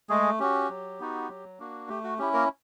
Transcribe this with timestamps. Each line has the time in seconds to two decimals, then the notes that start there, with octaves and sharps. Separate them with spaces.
0.09 G#3 A3 G#4
0.40 C#4 F#4 G4
0.69 F#3
1.00 B3 D#4 F#4
1.29 F#3
1.59 A#3 D4 F#4
1.89 A3 G4
2.04 F#4
2.19 C#4 E4 G4
2.34 A#3 A#4